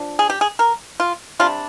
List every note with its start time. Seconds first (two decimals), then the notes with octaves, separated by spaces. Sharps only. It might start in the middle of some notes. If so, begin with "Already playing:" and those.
Already playing: F3 D4
0.19 G#4
0.30 G4
0.41 G#4
0.59 A#4
1.00 F4
1.39 C3 G3 D4 F4